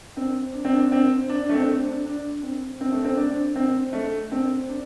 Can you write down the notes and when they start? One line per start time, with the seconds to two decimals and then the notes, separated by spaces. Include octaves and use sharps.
0.17 C4
0.54 D4
0.65 C4
0.76 D4
0.92 C4
1.29 D4
1.49 A3
1.54 C4
1.79 D4
2.05 D4
2.43 C4
2.81 C4
2.92 A3
3.05 C4
3.17 D4
3.56 C4
3.93 A3
4.32 C4
4.69 D4